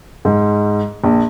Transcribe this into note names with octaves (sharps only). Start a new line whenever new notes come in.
G#2
A#1